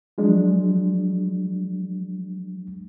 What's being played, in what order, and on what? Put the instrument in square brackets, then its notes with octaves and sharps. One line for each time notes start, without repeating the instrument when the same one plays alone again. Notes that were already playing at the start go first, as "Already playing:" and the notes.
[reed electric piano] F3 F#3 G#3 D4